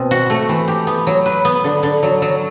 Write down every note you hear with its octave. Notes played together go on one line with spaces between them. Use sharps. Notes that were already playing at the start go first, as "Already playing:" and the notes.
Already playing: B2 C4
F#4
A3
E3
G4
B3
F#3
B4
B3
D3
D3
F#3
F#3